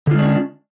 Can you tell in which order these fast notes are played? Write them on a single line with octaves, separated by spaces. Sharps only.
D3 F4 G#3 D4 C#4